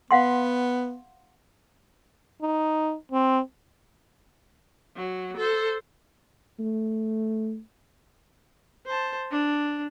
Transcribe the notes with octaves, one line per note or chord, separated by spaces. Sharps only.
B3 F5 F#5 C6
D#4
C4
F#3
A4 C5
A3
C5 A5
D4